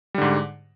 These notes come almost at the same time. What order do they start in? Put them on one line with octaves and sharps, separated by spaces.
G3 D3 G#2